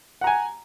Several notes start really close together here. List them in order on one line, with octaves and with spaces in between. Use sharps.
F#5 A#5 G#5